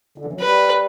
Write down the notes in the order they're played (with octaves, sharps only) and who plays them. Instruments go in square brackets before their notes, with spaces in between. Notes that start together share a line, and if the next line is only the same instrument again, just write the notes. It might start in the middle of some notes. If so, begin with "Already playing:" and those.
[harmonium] D3
E3
F#3
[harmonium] G3 [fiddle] B4